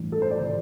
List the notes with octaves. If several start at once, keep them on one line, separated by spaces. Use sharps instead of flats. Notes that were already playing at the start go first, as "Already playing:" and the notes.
Already playing: A1 G2 E3
A4
C5
D5
C3 F3